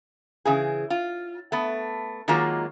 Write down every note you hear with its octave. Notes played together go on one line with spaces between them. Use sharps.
C#3 E3 G#4
F4
A3 B3
D#3 F#3 G#3 A#3 F4